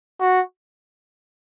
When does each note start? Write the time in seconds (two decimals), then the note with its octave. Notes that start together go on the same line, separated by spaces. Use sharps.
0.20 F#4